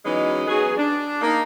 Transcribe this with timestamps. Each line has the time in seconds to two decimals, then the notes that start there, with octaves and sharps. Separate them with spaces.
0.06 E3 F#3 G#3 B3 C#4 D#4
0.47 F#3 B3 G#4
0.77 D4
1.22 A#3 D#4